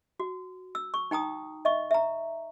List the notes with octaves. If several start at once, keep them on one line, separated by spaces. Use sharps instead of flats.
F#4
E6
C#6
D#4 G5 A#5 D#6
D#5 E5 C#6
E5 A#5